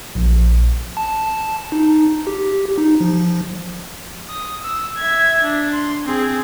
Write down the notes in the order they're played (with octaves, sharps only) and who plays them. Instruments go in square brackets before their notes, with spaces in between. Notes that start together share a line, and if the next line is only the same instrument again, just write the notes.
[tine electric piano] A#1
[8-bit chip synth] A5
D#4
G4
D#4
F3
[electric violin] D#6
E6
E5 G#6
D4
C6
C4 G#4